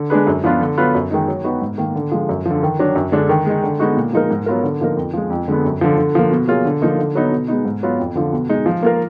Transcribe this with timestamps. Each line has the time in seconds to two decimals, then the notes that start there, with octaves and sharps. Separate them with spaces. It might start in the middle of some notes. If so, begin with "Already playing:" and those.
Already playing: D3
0.10 G#3 D4 G#4 B4
0.27 F#2
0.44 F3 B3 D4 F4
0.61 D3
0.77 F#3 B3 F4 B4
0.94 F#2
1.11 D#3 G#3 D#4
1.28 F#3
1.44 B3 D#4 F#4 B4
1.62 G#2
1.78 D#3 A#3
1.95 D3
2.11 F3 G#3
2.29 F#2
2.46 D3 F3
2.63 D#3
2.79 F#3 D4
2.96 F#2
3.12 D3 G#3 D4
3.29 D#3
3.46 G#3 D#4
3.63 D3
3.80 G#3 B3 D#4 F#4
3.97 A#2
4.13 F3 G#3 D#4 A#4
4.31 G#2
4.46 F#3 B3 F4 A#4
4.63 D3
4.81 F3 A#3 D#4 A#4
4.97 F2
5.13 F3 G#3
5.30 F2
5.48 D3 G#3 B3
5.65 F#2
5.81 D3 F3
5.98 D3
6.15 F3 A#3
6.31 B2
6.48 F#3 A#3 F4 G#4
6.65 D3
6.82 F3 A#3 D#4
6.99 D3
7.15 F#3 B3 D#4
7.32 B2
7.48 G#3 B3 D#4
7.65 G#2
7.83 F#3 B3 F4
7.99 F2
8.15 D3 F3
8.33 B2
8.49 G#3 D#4
8.66 F3
8.83 A#3 F4 A#4